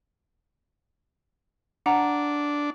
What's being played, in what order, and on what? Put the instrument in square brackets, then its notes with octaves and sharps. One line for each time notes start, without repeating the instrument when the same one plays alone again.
[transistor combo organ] D4 [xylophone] F#5 A#5